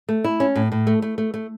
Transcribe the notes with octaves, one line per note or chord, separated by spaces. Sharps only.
A3
E4
C#4
A2
A2
A3
A3
A3
A3